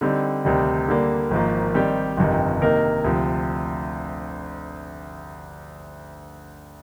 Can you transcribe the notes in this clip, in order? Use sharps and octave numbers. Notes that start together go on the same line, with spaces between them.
D3 G3 C4 D#4
D2 C3 D#3 G3
D3 G3 A#3
G#1 G#2 F3 A#3
D#3 G3 C4 G4
G1 F2 C3 D#3
C3 D#3 A#3 D#4 A#4
D2 C3 F3